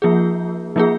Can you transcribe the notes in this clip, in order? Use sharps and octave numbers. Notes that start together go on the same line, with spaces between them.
F3 A#3 F4 G#4
F3 A#3 F4 G#4